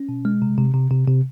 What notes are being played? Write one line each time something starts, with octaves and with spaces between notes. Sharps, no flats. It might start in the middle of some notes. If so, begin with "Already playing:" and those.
Already playing: C#4
B2
G#3
C3
C3
C3
C3
C3